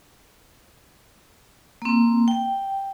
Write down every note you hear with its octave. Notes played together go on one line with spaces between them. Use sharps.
A#3 C4
G5